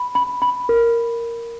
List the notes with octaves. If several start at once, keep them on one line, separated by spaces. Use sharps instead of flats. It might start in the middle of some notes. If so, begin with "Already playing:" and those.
Already playing: B5
B5
B5
A#4